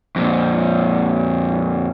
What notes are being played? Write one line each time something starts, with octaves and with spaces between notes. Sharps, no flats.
F2 A#2